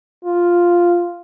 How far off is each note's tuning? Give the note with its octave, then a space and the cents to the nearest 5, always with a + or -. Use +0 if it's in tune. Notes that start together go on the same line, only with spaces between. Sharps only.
F4 +0